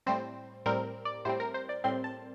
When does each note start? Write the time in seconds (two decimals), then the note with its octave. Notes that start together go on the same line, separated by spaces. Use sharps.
0.07 A2 G3 C4 C5
0.66 A2 G3 C4 A#4
1.05 D5
1.25 A2 G3 C4 C5
1.40 A#4
1.54 C5
1.69 D5
1.84 A2 G3 C4 C6
2.04 A5